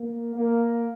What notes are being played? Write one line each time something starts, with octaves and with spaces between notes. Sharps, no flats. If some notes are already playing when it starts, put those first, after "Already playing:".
Already playing: A#3
A#3